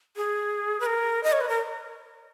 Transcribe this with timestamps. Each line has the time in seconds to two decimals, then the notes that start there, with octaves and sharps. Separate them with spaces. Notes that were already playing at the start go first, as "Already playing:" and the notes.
0.16 G#4
0.80 B4
0.86 A#4
1.23 D#5
1.32 C#5
1.41 B4
1.49 A#4